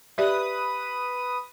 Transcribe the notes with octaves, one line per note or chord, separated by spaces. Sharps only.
G4 B4 D5 E5 D#6